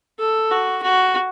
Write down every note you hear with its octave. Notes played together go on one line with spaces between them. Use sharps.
A4
F#4
F#4